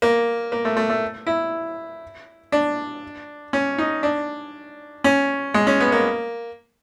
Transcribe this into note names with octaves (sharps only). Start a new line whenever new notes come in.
A#3
A#3
A3
A3
A3
E4
D4
C#4
D#4
D4
C#4
G#3
C#4
B3
A#3